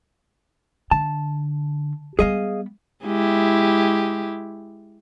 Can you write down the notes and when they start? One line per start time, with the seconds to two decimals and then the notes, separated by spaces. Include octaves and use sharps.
0.91 D3 A5
2.19 G3 B3 G#4 D#5 F5
3.05 G#3 E4 G4